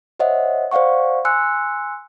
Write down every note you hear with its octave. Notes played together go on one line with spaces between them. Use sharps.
C5 C#5 D#5 E5 F#5
C5 D5 F5 F#5 C#6
G#5 C6 E6 F#6 C#7